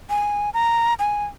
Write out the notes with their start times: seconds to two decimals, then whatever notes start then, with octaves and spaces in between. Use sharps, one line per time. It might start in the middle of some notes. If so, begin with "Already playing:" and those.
0.10 G#5
0.54 A#5
0.99 G#5